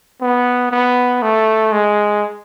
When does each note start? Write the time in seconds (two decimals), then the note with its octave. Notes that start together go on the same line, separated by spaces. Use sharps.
0.21 B3
0.72 B3
1.22 A3
1.72 G#3